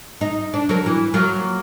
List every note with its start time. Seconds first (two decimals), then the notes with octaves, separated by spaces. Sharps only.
0.21 D#4
0.54 D4
0.69 F#3 A#4
0.86 E3
1.14 F#3 A#3 F4